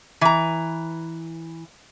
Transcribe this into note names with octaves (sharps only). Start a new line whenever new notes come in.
E3 A#5